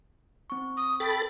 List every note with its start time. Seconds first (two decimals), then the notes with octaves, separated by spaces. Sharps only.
0.50 C4 C#6
0.77 D#6
1.00 A4 G5 B5 A6